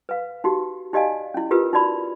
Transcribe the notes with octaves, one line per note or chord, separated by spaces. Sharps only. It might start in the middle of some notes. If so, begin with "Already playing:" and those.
B4 F5
D#4 F#4 G4
D#4 G4 D5 D#5 F5 G#5
C#4 E4
F4 G4 A#4 B4
D#4 F#4 D5 B5